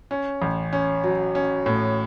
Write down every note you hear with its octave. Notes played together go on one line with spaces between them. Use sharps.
C#4
A1
C#4
F#3
C#4
A2